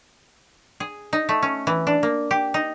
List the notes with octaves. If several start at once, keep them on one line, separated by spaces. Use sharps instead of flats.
G#4
D#4
A3
C#4
E3
D4
A#3
G4
D#4